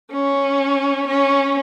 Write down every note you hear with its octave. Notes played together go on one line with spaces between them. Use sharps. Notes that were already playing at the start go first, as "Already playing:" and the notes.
C#4
C#4